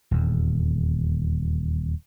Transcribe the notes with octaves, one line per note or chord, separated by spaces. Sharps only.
D#1 E2